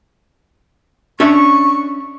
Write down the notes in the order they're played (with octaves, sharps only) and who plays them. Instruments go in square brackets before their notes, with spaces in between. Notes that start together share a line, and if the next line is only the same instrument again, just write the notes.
[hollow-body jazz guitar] C#4 D4 E5 [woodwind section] C#6